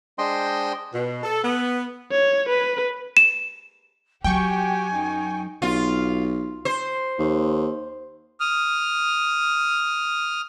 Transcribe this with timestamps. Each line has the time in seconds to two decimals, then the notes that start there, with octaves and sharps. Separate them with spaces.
0.18 G#3 D4 C5 D#5 G5 C6
0.93 B2
1.24 A4
1.44 B3
2.11 C#5
2.49 B4
3.17 E7
4.24 F#3 F#4 G4 G5 G#5 C#6
4.92 F#2 D#4
5.62 B1 F4
6.65 C5
7.18 D#2
8.40 D#6 F6